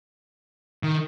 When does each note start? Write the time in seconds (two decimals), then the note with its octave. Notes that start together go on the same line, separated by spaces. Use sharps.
0.83 D#3